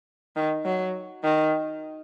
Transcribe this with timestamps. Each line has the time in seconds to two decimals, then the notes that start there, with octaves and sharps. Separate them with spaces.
0.36 D#3
0.65 F#3
1.24 D#3